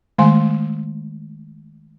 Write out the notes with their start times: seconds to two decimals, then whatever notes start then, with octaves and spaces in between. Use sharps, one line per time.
0.18 D#3 G#3 A3 F5 G#5 C6